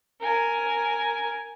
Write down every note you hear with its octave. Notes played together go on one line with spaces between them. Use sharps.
A#4 G#5